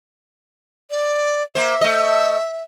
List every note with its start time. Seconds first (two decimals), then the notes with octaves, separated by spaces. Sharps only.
0.90 D5
1.55 A#3 C5 E5
1.81 A3 D#5